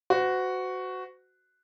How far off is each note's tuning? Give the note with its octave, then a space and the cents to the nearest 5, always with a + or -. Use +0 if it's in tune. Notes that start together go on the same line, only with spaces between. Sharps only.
F#4 +0 C5 -45